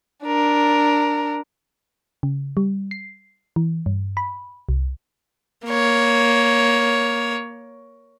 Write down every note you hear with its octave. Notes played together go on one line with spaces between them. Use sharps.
D4 A#4
C#3
G3
C7
E3
G2
B5
C2
A#3 C#5